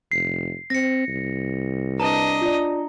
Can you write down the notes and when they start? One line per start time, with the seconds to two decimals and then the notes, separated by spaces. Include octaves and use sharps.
0.12 F1 C7
0.70 C4 A#6 C#7
1.08 C2
2.00 D4 B4 D#5 A5 A#5
2.41 F4 D5